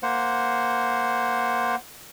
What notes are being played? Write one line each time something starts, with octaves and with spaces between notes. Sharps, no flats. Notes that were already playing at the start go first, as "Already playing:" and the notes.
A#3 C5 F#5